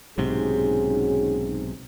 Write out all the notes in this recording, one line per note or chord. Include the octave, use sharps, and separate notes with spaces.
B1 G#2 C3 C#4 F#4 G#4